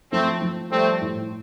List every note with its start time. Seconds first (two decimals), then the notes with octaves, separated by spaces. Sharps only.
0.12 F3 A3 C4
0.41 F3
0.71 G3 A3 C4
1.01 A2